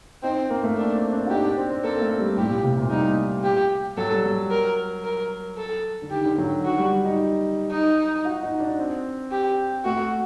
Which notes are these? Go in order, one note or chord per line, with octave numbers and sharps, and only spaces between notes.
C4 D#4
A#3
A3
A#3 D4
C4
D4
F#4
D#4 G4
D4
C4
C4
A#3 A4
A3
G3
A2 G4
A#2
C3
A#2
G3 D#4
G4
F#3 A4
G3
F#3
A#4
A#4
A4
D3
D#3 G4
D3
F#3
D#3 F#4
G3
D#4
D#4
F#4
D#4
D4
C4
G4
A3 F#4